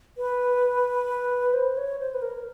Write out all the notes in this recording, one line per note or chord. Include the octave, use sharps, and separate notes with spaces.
B4
C5
C#5
C5
B4
A#4